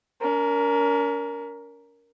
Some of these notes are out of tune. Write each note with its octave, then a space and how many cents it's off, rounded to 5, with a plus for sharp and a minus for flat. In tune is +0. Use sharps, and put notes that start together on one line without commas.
C#4 +45 A#4 +0